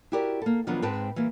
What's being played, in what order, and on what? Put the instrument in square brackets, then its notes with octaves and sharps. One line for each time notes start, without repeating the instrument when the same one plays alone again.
[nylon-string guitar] E4 F#4 G4 A#4 D5
A#3 A4
D#3 F3 F#3 B3 D4
G#2 G#3 C4 B4 G5 A5
E3 G3 A#3